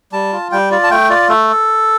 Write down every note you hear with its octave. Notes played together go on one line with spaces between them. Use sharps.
G3 A5
F4
G3 G5
F4 D5
A5
A3 G5
F4 D5
A3 A4